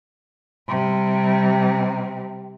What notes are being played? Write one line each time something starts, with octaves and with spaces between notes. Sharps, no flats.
C3 G3